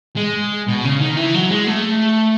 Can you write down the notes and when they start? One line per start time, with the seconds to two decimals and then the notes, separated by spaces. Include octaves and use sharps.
0.16 G#3
0.67 B2
0.84 C#3
1.00 D#3
1.17 E3
1.34 F#3
1.51 G#3
1.67 A3